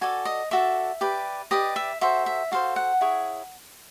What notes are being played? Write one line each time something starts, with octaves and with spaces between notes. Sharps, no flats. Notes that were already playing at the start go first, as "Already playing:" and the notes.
F#4 A4 D5 G#5
D#5
F#4 A4 D5 E5
G4 B4 D5
G4 B4 D5 D#5
E5
F#4 A4 C5 E5
E5
F#4 A4 C5 F5
F#5
E4 G#4 C#5